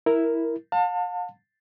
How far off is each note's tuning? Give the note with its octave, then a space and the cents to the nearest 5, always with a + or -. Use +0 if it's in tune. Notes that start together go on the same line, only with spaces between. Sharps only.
E4 -5 A#4 +0
F5 +40 A5 +30